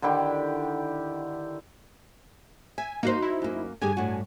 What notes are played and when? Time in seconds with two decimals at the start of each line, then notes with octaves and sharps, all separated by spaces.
0.02 D3 D#3 E4 G4
2.78 E5 G#5
3.03 A#3 D#4 F#4 C5
3.22 E4
3.42 F#2 A#3
3.81 G2 D3 G4 G#4 G#5
3.97 A2 D4 F#4